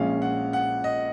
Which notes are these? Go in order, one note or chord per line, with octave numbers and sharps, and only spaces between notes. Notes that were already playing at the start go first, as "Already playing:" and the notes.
Already playing: A#1 A#2 G#3 C#4 F5
F#5
F#5
D#5